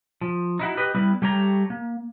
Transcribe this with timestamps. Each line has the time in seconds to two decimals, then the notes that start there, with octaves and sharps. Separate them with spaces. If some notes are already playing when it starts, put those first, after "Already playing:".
0.21 F3
0.59 D#4 E4 F#4
0.77 G4 B4 D#5
0.95 G3 B3 E4 B4
1.22 G3 A3 G4 C#5 A#5
1.70 A#3